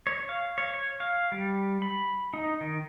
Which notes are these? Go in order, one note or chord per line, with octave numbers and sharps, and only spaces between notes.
C#5
F5
C#5
C#5
F5
G3
B5
D#4
D#3